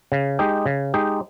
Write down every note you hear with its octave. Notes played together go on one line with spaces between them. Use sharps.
C#3
G#3 D#4 G4
C#3
G#3 D#4 G4